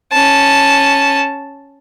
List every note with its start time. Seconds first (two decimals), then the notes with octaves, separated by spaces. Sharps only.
0.12 C#4 A5